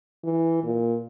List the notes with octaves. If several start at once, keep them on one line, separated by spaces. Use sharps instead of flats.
E3
A#2